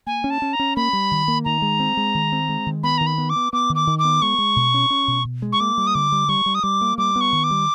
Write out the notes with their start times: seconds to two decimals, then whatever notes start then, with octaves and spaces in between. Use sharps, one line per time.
0.06 A#3 G#5
0.24 C#4
0.30 A5
0.42 C#4
0.53 A#5
0.59 C#4
0.76 A#3 B5
0.93 G3
1.11 D#3
1.28 A#3
1.45 D#3 A#5
1.62 G#3
1.80 C4
1.97 G#3
2.15 D#3
2.32 C4
2.49 G#3
2.66 D#3
2.83 B3 B5
2.98 D#3 A#5
3.07 B5
3.18 B3
3.30 D6
3.36 B3
3.53 B3 D6
3.69 D#3
3.75 D6
3.87 D#3
3.99 D6
4.04 B3
4.22 G#3 C#6
4.38 G#3
4.56 B2
4.74 C#4
4.90 C#4
5.08 B2
5.25 B2
5.42 G#3
5.52 C#6
5.60 A#3 D6
5.78 G3
5.87 D#6
5.95 D3 D6
6.12 G3
6.29 G3 C#6
6.46 G3
6.55 D#6
6.63 G3 D6
6.81 A#3
6.98 G3 D6
7.16 B3
7.21 C#6
7.32 D#3
7.44 D6
7.51 G3